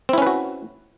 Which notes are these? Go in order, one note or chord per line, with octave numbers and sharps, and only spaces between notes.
C4 C#4 E4 F#4 B4